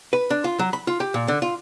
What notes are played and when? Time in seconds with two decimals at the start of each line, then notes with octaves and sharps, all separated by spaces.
0.13 B4
0.30 D4
0.44 F4
0.59 F#3
0.73 B5
0.87 F4
1.00 G4
1.14 A#2
1.28 D3
1.42 F4